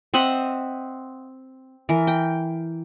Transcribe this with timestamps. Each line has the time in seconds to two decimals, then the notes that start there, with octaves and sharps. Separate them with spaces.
0.14 C4 D#5 E5 F#5
1.89 E3 A#4
2.07 G5